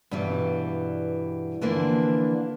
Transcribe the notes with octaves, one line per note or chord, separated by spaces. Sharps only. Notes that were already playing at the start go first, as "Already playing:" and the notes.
G2 B2 E3 G3
D3 E3 F3 A#3 D4